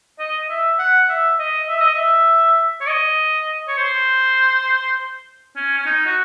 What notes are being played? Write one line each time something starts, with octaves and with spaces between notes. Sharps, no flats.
D#5
E5
F#5
E5
D#5
E5
D#5
E5
C#5
D#5
C#5
C5
C#4
C#4
D#4
F#4